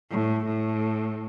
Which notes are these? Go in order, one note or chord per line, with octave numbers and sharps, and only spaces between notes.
A2
A2